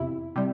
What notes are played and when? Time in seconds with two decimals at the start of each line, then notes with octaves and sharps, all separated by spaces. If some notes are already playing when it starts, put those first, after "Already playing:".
Already playing: E2 C3 E4
0.36 C3 G3